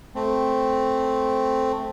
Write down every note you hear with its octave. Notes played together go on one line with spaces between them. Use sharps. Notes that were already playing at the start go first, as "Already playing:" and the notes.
A3 C4